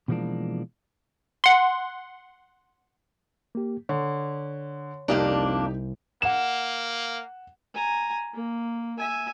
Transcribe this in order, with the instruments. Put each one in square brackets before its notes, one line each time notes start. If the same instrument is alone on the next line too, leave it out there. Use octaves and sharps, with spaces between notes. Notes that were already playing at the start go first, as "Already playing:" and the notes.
[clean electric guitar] B2 E3 F3 G#3 A#3 D4
[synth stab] F#5 C6
[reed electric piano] A#3 G4
[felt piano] D3 [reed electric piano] C#5
[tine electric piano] C2 [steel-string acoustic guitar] F2 A#3 D4 [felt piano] D#4 G4
[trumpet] A#3 [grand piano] F#5 E7
[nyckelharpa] G#5 A#5
A#3
E5 G#5